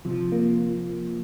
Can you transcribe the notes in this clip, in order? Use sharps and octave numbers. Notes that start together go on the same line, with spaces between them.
C3 F3
A#3